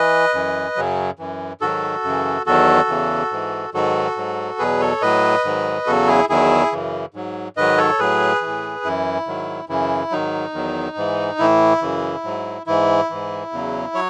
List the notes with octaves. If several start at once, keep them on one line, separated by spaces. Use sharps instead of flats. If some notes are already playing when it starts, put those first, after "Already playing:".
Already playing: E3 B4 D#5
F#2 E3
F#2 C#3 F#3
F#2 E3
G#2 D#3 F#3 F#4 A4
F#2 C#3 E3
E2 D#3 F#3 F#4 A4
E2 C#3 E3
G#2 E3
G#2 D#3 F#3 F#4 A4
G#2 F#3
E2 B2 F#3 G#4 B4
A4 C#5
A2 F#3 B4 D#5
G#2 D#3 F#3
E2 C#3 F#3 F#4 A4
E4 G#4
E2 D#3 F#3 E4 G#4
F#2 C#3 E3
G#2 F#3
G#2 D#3 F#3 B4 D#5
A4 C#5
A2 F#3 G#4 B4
E3
A2
F#2 E3 E4
G#2 D#3 F#3
F#2 C#3 E3 E4
G#2 D#3 F#3 D#4
E2 D#3 F#3
G#2 E3
A2 E3 E4
F#2 C#3 E3
G#2 F#3
G#2 E3 E4
G#2 E3
E2 C#3 F#3
F#3 C#5